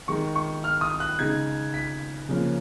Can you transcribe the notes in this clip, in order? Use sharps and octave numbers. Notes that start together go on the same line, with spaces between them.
D#3 G#3 D#4 C#6
C#6
F6
D#6
F#6
C#3 G#3 D#4 G#6
B6
C#3 F3 A#3 C#4